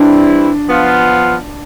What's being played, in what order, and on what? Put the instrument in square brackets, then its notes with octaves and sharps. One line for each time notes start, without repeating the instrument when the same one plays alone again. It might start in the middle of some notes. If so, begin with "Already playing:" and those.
Already playing: [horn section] E3 G3 C4 E4 [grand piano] D4
[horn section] F3 B3 F4